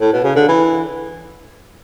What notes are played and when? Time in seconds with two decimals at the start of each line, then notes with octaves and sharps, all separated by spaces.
0.01 A2
0.13 B2
0.24 C#3
0.35 D3
0.48 E3